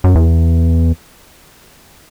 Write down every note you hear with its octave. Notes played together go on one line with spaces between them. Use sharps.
F#2
E2